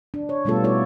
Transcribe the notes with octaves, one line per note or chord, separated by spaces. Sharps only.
D4
C#5
B2 G3 A3 B3 F4 A4
D#4 F4 A4 C#5 D5